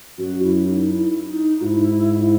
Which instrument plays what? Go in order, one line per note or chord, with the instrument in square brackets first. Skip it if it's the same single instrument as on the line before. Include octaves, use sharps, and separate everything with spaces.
[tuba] F#2 [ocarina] F#4
[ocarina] E4
D#4
E4
D#4
[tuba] G#2 [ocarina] E4 F#4
[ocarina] E4